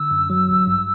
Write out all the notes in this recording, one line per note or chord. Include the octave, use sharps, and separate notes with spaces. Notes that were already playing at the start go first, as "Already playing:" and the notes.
Already playing: D3 E6
F#2
F#3
A1
G2